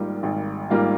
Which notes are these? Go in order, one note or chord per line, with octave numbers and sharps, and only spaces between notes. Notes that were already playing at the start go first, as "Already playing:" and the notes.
Already playing: G#1 G#2 G3 A#3 F4
G#1
G#2 G3 A#3 F4